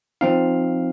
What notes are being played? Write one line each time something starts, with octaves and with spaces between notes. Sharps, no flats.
F3 C4 D#4 F5